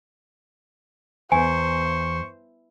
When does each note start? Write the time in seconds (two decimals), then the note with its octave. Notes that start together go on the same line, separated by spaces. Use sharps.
1.32 E2 C5 G#5 C#6